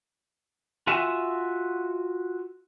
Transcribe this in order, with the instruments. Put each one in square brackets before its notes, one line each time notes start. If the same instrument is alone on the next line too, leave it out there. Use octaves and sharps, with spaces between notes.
[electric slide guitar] F4 F#4 E5 G#5